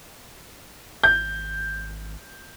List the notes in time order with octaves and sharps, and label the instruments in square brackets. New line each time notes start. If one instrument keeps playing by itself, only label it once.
[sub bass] G#1 [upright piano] G6